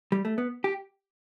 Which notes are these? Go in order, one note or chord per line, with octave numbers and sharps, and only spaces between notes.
G3
A3
B3
G4